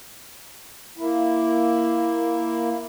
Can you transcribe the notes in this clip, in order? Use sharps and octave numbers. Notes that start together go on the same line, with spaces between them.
A#3 E4